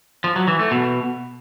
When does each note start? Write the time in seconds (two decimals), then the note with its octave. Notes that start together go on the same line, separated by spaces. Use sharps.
0.24 F3
0.36 F#3
0.48 E3
0.59 A3
0.71 B2